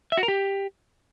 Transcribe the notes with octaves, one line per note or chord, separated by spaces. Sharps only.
E5
F#4
A#4
G4